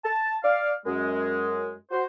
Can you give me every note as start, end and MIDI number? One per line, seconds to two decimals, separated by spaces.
0.04 0.37 81
0.43 0.72 74
0.43 0.72 77
0.86 1.73 42
0.86 1.73 56
1.91 2.04 66
1.91 2.04 72